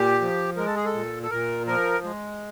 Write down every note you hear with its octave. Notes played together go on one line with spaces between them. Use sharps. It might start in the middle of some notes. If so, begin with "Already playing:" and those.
Already playing: A#2 G4
F3
G#3 A#4
A4
G#4
A4
A#2
A4
A#2 A#4
F3 A#4
G#3